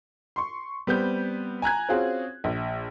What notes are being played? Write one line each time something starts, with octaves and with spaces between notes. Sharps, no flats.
C6 C#6
G3 B3 C4 G6
G#5 A#5 F#6 G#6
C4 C#4 F4 F#4 G#4
A#1